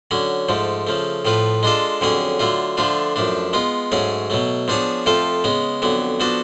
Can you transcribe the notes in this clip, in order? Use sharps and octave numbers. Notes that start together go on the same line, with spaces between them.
D3 F#3 C#4
G#2 F3 A3
C#3 F3 A3
A2 F3 A3 F4 B4
G#3 D4 F4 A4
F2 D3 F#3 C#4 G#4
D3 F#3 A3 F4
D3 F3 A3 D4 F4
F#2 F3 A3 D4
G#3 B3 F4
G#2 F#3 A3 C#4 G#4
B2 F#3 A3
F3 B3 D4 G#4 C#5
F2 F3 A3 F4 A4
C#3 G#3 B3
F2 D3 F#3 B3
F3 B3 D4 F#4 A4